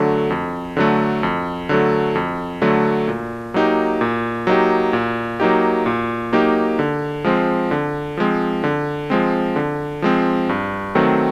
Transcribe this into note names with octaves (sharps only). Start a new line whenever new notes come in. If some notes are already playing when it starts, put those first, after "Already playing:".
Already playing: D3 F#3 A3
F2
D3 F#3 A3
F2
D3 F#3 A3
F2
D3 F#3 A3
A#2
F#3 A#3 D#4 G4
A#2
F#3 A#3 D#4 G4
A#2
F#3 A#3 D#4 G4
A#2
F#3 A#3 D#4 G4
D3
F3 G#3 C4
D3
F3 G#3 C4
D3
F3 G#3 C4
D3
F3 G#3 C4
G2
D#3 F#3 A3 C4